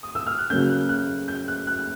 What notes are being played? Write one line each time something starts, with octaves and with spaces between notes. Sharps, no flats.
D#6
E6
F6
F#6
C#3 F#3 A#3 C#4 G6
F#6
F#6
G6
F#6
F#6
F#6